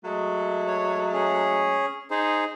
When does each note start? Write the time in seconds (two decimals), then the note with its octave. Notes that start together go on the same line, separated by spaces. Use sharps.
0.04 F#3 G#3 A3
0.67 C#5
1.13 C#4 G#4
2.11 D#4 G#4 C5